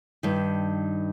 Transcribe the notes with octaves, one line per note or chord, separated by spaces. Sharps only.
G2 D#3